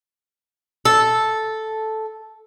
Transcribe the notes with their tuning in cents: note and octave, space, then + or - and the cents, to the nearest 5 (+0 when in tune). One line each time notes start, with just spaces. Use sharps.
A4 -5